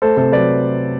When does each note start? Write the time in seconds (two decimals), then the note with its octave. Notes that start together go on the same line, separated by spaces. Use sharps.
0.02 A3 A4 C5
0.16 C3 A4 C5
0.32 F#3 B4 D5